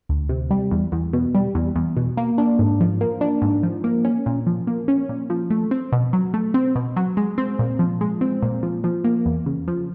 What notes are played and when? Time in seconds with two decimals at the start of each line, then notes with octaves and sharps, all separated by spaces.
0.09 D2
0.29 C3
0.51 G3
0.71 E2
0.92 E2
1.13 B2
1.35 G3
1.55 E2
1.75 E2
1.97 B2
2.17 A#3
2.38 D4
2.59 G#2
2.80 F3
3.01 A#3
3.21 D4
3.42 G#2
3.63 F3
3.84 A#3
4.05 C#4
4.26 A#2
4.47 F3
4.67 A#3
4.88 C#4
5.09 A#2
5.30 F3
5.50 A3
5.71 C4
5.92 B2
6.13 F#3
6.34 A3
6.54 C4
6.75 B2
6.96 F#3
7.17 G#3
7.38 C4
7.59 A#2
7.79 F3
8.01 G#3
8.21 C4
8.43 A#2
8.63 F3
8.84 F3
9.04 A#3
9.26 E2
9.46 C#3
9.68 F3